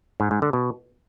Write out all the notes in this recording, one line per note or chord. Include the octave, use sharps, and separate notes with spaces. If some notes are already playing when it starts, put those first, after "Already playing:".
G#2
G#2
D3
B2